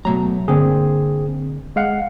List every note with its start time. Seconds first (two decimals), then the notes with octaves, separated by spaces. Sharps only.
0.05 B2 F#3 A3 A#5
0.48 G1 D3 A#3 C4 G#4
1.76 G#3 F5 F#5